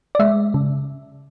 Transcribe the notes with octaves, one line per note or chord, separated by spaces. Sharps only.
D5
G#3 E5
C#3